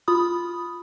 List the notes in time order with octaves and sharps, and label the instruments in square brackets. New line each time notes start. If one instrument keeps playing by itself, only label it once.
[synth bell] F4 B5 D#6